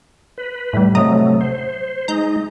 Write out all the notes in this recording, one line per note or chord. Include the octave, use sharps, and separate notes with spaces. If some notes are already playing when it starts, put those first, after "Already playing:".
B4
A2 G3
C3 F#3 A3 D#5 A#5 D#6
C5
G#3 D#4 A#5 G6